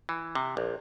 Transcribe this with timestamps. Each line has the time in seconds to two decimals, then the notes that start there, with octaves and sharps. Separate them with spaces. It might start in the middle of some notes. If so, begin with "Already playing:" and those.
0.09 E3
0.35 C3
0.57 A#1